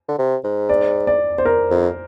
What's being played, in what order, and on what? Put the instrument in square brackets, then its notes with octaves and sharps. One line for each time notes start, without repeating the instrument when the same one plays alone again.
[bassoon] D3
C3
G#2
[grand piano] D5
D5
C5
A#4
[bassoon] F2